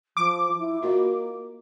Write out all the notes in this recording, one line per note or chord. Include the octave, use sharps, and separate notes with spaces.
F3 D6
E4
A#3 F4 F#4 D#5